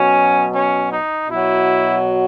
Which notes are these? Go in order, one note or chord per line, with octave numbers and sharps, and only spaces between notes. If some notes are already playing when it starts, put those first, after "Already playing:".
Already playing: B2 F#3 C#4
C#4
D#4
B2 F#3 E4